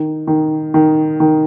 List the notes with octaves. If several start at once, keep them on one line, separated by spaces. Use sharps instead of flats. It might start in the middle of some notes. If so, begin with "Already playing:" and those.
Already playing: D#3
D#3
D#3
D#3